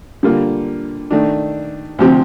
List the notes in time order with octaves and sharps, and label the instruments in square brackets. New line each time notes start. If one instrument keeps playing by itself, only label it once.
[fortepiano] D3 G3 A#3 F4
D#3 A3 D4
D2 C3 F3 C4 G4